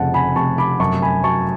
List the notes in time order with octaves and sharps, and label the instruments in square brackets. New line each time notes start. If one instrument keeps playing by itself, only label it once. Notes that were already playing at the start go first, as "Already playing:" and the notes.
Already playing: [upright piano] F1 F2 C#3 F#5 A5
G#5 B5
F1 A5 C#6
B5 D6
F#2 A5 C#6
G#5 B5
F#3 A5 C#6